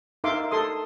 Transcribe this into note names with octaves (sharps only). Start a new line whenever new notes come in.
D#4 A#4 E5 F5 C6 D6
A4 C6 D#6